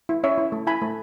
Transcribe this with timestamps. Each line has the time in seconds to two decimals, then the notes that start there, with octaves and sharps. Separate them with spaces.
0.09 E4
0.24 C#4 C#5 E5
0.38 E4
0.52 A3
0.67 E4 G#5 B5
0.82 A3